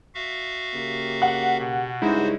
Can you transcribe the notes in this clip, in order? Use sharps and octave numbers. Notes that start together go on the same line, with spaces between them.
F#4 E5 F5
C#3 A#3 G4
F#5
B2
G2 C#3 G#3 D#4 E4 F#4 C5